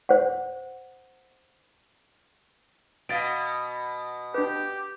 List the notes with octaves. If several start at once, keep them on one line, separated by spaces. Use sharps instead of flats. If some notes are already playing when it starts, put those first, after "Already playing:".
C5 F#5
B2 F5 A6 D7
D4 G4 B4